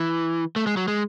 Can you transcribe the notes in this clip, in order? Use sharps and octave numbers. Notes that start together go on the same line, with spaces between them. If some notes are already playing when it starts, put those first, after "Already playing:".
Already playing: E3
A3
G#3
F#3
G#3